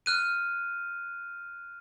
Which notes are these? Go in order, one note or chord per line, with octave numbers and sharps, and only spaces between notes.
F6 F#6 D#7